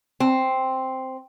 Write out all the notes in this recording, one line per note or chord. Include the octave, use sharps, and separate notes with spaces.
C4